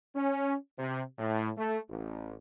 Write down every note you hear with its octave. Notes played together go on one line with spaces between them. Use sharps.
C#4
C3
A2
A3
A1